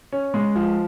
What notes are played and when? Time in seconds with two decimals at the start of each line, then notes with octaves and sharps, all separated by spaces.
0.12 C#4
0.34 G#3
0.56 F3